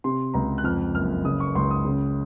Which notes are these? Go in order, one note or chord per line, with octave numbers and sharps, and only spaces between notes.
C3 C6
C#2 A#5
F#6
F2 F6
F#1 F6
C#3 D#6
C#6
C#2 C6
D#6
C#3